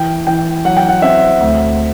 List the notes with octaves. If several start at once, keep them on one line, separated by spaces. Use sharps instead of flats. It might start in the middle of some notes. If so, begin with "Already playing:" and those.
Already playing: E3 G5
E3 G5
F#3 F#5
G5
F#5
C4 E5
D2